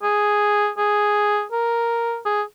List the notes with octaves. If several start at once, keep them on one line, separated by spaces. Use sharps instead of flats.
G#4
G#4
A#4
G#4